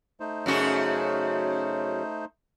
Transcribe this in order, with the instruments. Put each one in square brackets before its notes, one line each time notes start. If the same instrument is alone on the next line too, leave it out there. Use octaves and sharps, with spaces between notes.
[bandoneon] A3 D#4 C5
[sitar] F#2 C#3 F#4